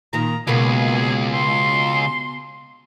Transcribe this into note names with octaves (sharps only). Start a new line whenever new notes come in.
A#2 D#3 A#5
C#2 B2 A#3 G#4
C6